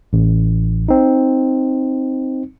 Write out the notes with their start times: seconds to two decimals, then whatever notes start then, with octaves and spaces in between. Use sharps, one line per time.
0.13 A1
0.89 C4 D#4